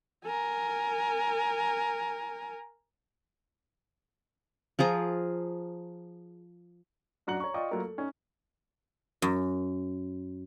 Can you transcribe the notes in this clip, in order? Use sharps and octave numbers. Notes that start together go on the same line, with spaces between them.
A#4 G#5
F3 F4 G#4 A#5
F#2 D4 F#4 A#5 C#7 F#7
C#5 A#5 C#6
F4 D5 D#5 G5 C#6
F#3 A3 A#3 F4 A#4
A4
C#4 D#4
F#2